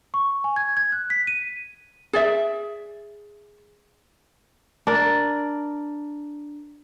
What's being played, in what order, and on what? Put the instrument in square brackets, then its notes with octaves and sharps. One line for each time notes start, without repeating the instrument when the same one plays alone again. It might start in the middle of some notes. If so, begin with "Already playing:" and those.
[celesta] C#6
G#5
G#6
G#6
F#6
B6
D#7
[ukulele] G#4 D5 E5
[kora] D4 A#4 D5